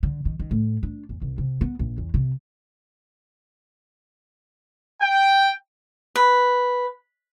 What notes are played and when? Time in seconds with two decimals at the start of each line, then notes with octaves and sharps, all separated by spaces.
0.03 D3
0.25 D#3
0.39 D#3
0.51 A2
0.83 D4
1.09 E2
1.22 C2
1.38 C3
1.61 B3
1.79 A#1
1.98 E2
2.14 C3
5.02 G5
6.16 B4